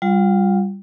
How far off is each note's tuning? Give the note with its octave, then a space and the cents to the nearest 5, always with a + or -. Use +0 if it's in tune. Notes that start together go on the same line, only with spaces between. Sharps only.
G3 +0 F4 +0 F#5 -45